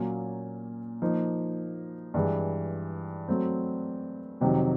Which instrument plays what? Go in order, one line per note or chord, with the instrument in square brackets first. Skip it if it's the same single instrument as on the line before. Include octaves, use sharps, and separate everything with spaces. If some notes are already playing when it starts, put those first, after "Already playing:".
Already playing: [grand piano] A#2 F#3 A#3 C#4
F3 A#3 D#4
G2 E3 G#3
F#3 A3 C4
F2 C3 D#3 F#3